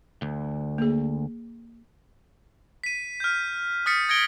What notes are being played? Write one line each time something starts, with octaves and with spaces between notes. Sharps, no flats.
D2
A#3 G#4
B6 D#7
F6 G6
D#6 F6 A6 B6 C#7
D#6 G#6 A#6 C#7 D7 G7